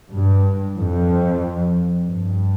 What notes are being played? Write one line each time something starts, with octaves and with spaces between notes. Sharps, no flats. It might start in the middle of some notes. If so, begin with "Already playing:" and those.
G2
F2
G2